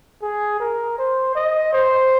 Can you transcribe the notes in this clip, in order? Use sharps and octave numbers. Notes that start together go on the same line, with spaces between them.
G#4
A#4
C5
D#5
C5